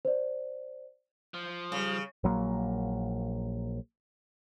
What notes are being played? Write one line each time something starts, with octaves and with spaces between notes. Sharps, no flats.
C5 D5
F3
C#3 G3
A#1 F#3 A#3